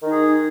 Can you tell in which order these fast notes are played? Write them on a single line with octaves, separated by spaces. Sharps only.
D#3 D#4 G#4